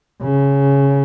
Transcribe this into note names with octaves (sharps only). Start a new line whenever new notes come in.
C#3